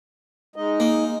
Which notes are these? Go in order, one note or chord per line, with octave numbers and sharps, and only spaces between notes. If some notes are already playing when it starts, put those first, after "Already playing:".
G#3 D#4 D#5
A#3